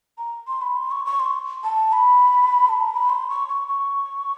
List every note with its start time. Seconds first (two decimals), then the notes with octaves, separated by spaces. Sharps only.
0.18 A#5
0.48 C6
0.62 B5
0.77 C6
0.91 C#6
1.06 C#6
1.20 C6
1.64 A5
1.93 B5
2.69 A5
2.83 A#5
2.96 B5
3.10 C6
3.29 C#6
3.48 C#6
3.68 C#6